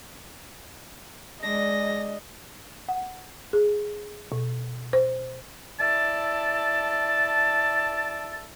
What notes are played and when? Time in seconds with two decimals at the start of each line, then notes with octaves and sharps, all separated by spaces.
1.43 G#3 D4 D#5 A#6
2.89 F#5
3.53 G#4
4.32 B2
4.93 C5
5.80 E4 A4 D5 A5